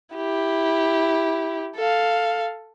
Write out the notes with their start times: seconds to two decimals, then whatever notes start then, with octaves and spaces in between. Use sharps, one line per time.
0.16 E4 G4
1.76 A4 F5